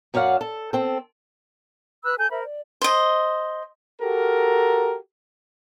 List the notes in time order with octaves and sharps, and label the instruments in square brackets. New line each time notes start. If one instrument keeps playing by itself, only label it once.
[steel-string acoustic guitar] F#2 C#4 D5 F5 F#5
A4
C4 A4
[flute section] B4 B5 E6 F#6
A4 G#5 A5 G6
A#4 C5 E5 B5
D5
[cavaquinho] C5 D#5
[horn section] F#4 G4 A4 A#4